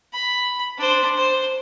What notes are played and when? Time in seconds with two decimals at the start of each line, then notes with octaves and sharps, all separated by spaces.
0.13 B5
0.78 D4 C5
1.17 C5